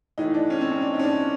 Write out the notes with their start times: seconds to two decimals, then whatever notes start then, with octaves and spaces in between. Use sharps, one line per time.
0.18 A2 E3 D#4
0.34 D4
0.50 C#4
0.61 C4
0.71 C#4
0.82 D4
0.94 D#4
0.99 C#4
1.03 D4